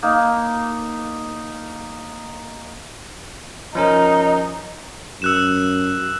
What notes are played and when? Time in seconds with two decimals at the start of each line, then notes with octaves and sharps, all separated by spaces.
0.03 A#3 D#4
3.75 F3 C#4 D#4 A#4
5.22 F#2 E6 F#6 E7